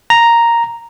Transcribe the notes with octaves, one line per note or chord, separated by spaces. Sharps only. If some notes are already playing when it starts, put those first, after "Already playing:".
A#5